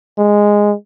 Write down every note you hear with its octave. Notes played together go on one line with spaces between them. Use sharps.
G#3